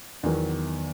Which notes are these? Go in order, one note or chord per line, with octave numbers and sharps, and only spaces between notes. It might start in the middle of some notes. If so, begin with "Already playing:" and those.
E2 D#3 F#3